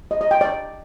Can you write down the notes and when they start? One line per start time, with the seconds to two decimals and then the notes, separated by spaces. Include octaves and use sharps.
0.11 D#5
0.21 D#5
0.31 G5
0.41 D5